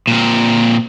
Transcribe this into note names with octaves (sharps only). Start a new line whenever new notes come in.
A#2 C4